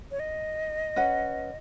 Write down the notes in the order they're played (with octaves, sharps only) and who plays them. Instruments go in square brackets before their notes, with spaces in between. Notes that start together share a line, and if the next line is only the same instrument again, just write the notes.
[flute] C#5
D#5
[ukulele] C#4 B4 F#5